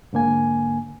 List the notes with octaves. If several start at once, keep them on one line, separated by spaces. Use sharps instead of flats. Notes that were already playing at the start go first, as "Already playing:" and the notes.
G#2 D3 A#3 G#5